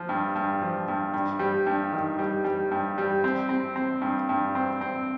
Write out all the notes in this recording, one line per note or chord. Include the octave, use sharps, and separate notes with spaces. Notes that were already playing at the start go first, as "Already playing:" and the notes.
Already playing: F3
G2
G2
F3
G2
G2
G3
G2
D#3
G3
G3
G2
G3
C4
C4
C4
G2
G2
C4
C4